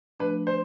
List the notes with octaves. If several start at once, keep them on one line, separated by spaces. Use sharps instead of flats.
F3 A3 D4 B4
C5